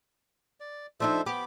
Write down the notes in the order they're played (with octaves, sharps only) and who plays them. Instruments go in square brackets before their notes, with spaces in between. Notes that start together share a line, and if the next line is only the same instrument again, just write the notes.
[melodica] D5
[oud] F3 D4 D#4 [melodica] A4 C5 E5
[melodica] B3 B5 D6 [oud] G4